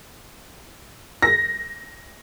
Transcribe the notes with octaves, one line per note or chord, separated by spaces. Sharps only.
A#6